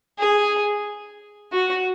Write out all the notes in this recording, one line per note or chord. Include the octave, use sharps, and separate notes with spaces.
G#4
F#4